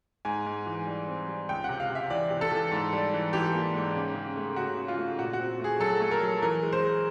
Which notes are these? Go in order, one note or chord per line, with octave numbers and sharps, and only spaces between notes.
G#2 G#5
G#2
E3
G3
C4
G3
C#2 G5
C3 F#5
F5
C3
E5
E3 D5
C3
A4
E3
G#2
G3
E3
E3 G4
A#3
G#2
C#3
C#3
A3
C#3 F#4
C#3
F4
A3
A#2 F#4
F#4
C4
A3 G#4
F#3 A4
A3
A#4
F#3
E3 A#4
G#3
C5
G#3